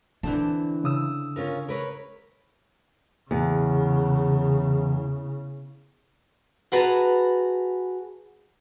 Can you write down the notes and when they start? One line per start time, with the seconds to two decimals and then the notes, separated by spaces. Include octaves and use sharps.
0.23 D3 E3 C4 A5
0.84 C#3 D#6 E6
1.36 C#4 F4 A#4
1.68 A#4 B4 C#5
3.31 E2 C#3
6.72 F#4 G#4 B4 A5 A#5